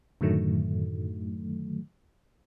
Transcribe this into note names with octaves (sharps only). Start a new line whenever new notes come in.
F#2 A2 D3 D#3 F#3 A3